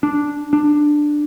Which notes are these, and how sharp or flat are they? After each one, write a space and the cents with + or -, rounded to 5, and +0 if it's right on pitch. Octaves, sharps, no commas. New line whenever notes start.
D4 -5
D4 +10